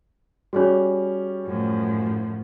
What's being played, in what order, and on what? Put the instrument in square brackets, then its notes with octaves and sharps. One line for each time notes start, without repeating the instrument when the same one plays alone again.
[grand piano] G3 C#4 [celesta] F#4 G#4 C#5
[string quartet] F#2 A2 F3